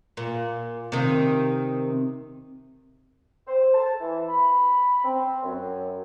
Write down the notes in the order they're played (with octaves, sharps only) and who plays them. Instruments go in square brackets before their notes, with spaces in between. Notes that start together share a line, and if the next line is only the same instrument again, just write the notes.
[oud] A#2
C3 D#3
[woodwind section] C5
A5
E3
B5
C4
F#2